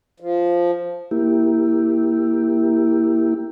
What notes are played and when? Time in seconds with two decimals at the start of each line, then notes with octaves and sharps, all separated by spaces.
0.20 F3
1.11 A#3 E4 G4